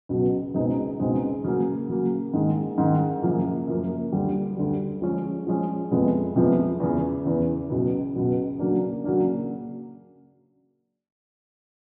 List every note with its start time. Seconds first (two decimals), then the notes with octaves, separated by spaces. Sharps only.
0.09 C#2 B2 F#3
0.54 C#2 B2 G#3 C4 D#4
1.00 C#2 B2 G#3 C4 D#4
1.44 C#3 F#3 A#3
1.89 C#3 F#3 A#3
2.33 G#2 D#3 G#3
2.78 G#2 D#3 G#3
3.23 F#2 C#3 F3 A#3
3.67 F#2 C#3 F3 A#3
4.12 D2 D3 G3
4.57 D2 D3 G3
5.02 F3 G#3 C#4
5.47 F3 G#3 C#4
5.91 F2 C3 F3 G#3 B3
6.36 F2 C3 F3 G#3 B3
6.80 E2 C#3 E3
7.25 E2 C#3 E3
7.70 C#2 B2 F#3
8.15 C#2 B2 F#3
8.59 C#3 F#3 A#3 D4
9.04 C#3 F#3 A#3 D4